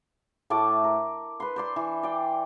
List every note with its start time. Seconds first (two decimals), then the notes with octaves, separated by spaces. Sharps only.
0.50 A2 A3 A5 D6
0.84 A#4
1.40 B4 C6
1.56 C5 D5 C6
1.76 E3
2.03 D5 G5